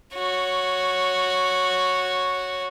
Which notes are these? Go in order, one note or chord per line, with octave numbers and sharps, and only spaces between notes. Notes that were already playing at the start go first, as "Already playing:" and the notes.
F#4 C#5